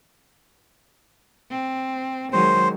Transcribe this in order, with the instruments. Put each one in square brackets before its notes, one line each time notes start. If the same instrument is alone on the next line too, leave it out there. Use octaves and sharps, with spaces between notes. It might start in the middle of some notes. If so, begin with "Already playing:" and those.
[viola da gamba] C4
[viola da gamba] D#3 F#3 G#3 [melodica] C5